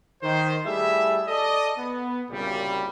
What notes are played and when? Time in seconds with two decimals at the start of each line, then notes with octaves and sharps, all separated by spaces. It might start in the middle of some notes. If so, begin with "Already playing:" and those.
0.23 D#3 C5
0.65 G3 A3 E4 G#4 E5
1.28 A4 D5 D#5
1.78 B3
2.31 C2 F#2 A#2 C#3 G3